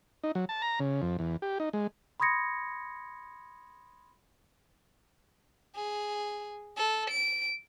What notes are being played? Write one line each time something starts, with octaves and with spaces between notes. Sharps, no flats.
D#4
F#3
A5
A#5
C#3
F2
E2
G4
D#4
G#3
B5 C6 D#6 G#6 A#6 C#7
G#4
A4
D7